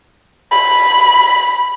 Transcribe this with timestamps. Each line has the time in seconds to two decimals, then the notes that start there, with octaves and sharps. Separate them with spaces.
0.52 B5